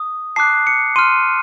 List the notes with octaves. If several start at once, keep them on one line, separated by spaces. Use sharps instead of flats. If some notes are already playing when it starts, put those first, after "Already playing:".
Already playing: D#6
A5 D6 F#6 C7
C#7
C6 F6 D#7